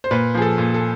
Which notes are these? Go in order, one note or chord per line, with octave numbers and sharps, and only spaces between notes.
C5
A#2 B4
F3 G#4
A4
A#2
A4